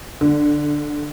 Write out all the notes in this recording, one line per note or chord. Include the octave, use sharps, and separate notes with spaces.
D3